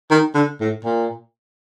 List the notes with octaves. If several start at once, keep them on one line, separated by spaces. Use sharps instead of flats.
D#3
D3
A2
A#2